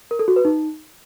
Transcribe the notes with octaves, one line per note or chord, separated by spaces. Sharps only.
A#4
A4
F#4
B4
D#4